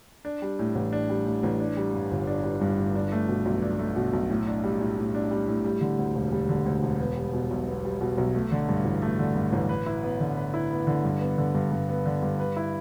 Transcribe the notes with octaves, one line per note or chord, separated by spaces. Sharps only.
D4
G3
A2
A1
D4
G3
A2
A1
D4
G3
G2
G1
D4
G3
G2
G1
D4
A3
B2
B1
D4
A3
B2
B1
A2
D4
G3
A2
A2
D4
G3
A2
G3
D3
D2
E1
G3
D3
D2
E1
B3
G3
B2
B1
B3
G3
B2
B1
A3
D3
G2
A1
A3
D3
G2
A1
B4
E4
B3
D3
B4
E4
B3
D3
G2
B3
D3
G2
G2
B3
D3
G2
B4
E4